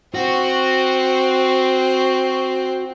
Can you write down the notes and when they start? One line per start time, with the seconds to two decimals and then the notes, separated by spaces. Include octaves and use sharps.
0.14 C4 F#4